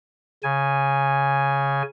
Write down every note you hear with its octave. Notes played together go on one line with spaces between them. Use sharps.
C#3 G#5